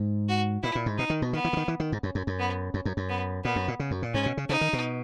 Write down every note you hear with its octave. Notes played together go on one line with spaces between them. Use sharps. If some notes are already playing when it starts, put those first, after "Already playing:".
Already playing: G#2
F#4
A#2 E4
A#2
G#2
B2 D#4
D#3
B2
D#3 B3
E3
C#3
D#3
E3
D#3
G#2
F#2
F#2
F#2
B3
F#2
F#2
F#2
B3
A#2 B3
F#2
A#2
C#3
F#2
A#2
G#2 C#4
B2
C#3
C#3 D#4
D#3
B2